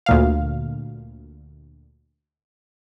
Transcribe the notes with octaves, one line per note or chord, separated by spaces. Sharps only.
D2 A#2 F5